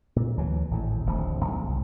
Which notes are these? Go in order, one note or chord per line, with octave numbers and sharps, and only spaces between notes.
A#2
D2 E3 F#3
G#1 A2
D1 G#1 D2 F3
B1 G#2
C2